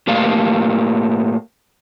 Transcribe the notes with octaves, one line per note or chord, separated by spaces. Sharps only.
A2 A3 A#3 G4 D5 F5